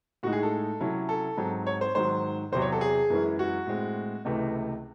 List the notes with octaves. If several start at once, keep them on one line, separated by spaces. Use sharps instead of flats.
A2 G#3 D#4 F#4
G#4
A4
C3 F#3 C#4 E4
A4
G#2 F#3 C4
C#5
C5
G#2 D#3 F#3 C5
E2 C3 F#3 C5
C#5
A4
G#4
F#2 E3 G#3 C#4 E4
F#4
A2 G#3 C4
C#2 C3 E3 A3